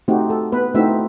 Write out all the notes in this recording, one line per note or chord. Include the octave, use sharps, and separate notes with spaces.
A3 C4 D#4 F#4 G4
A4
B3 B4
A3 C4 D#4 E4 F#4 E5